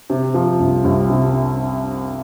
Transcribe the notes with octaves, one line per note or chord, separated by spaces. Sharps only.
C3
F3
C2
C2
C3